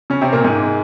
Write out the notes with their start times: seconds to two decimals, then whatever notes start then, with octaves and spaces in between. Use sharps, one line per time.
0.10 C#3 C#4
0.21 C3 C4
0.33 A#2 A#3
0.44 G#2 G#3